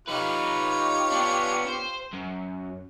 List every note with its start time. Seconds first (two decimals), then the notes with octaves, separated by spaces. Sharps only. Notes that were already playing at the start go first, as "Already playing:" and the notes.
0.08 D#4 F4 G4 B4 C#5
1.12 B3 D4
1.68 C5
2.13 F#2